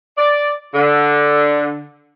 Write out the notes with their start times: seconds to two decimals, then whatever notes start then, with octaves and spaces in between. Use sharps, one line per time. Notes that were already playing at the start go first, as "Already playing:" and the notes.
0.18 D5
0.74 D3